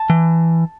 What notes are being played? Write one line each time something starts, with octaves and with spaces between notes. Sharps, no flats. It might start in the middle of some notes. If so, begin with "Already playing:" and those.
Already playing: A5
E3